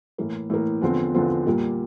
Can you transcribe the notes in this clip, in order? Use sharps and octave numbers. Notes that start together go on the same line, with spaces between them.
A2 E3 A#3
A2 E3 A#3
E2 D3 F3 C4 F4
E2 D3 F3 C4 F4
A#2 G3 A#3